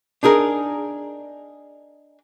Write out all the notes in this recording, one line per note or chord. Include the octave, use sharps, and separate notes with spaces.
D4 D#4 G#4 A#4